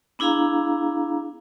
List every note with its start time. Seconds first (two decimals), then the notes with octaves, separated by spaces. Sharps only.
0.19 B3 D4 E4 G#4 F5 A#5